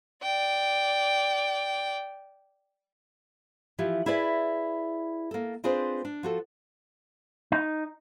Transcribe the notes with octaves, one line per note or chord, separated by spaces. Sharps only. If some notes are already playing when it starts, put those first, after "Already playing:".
D5 G5
E3 F3 E4 G4
E4 G#4 B4 D5 E5
A#3 A4
C4 D4 F4 G#4 B4 C5
D4
F3 F#4 A4
D#4